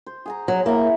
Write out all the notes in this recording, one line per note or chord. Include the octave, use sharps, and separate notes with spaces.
C5
G#4 F#5 A#5
F#3
A#3 E4 E5 A#5